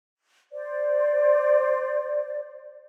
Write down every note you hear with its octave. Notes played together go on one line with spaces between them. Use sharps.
C5 D5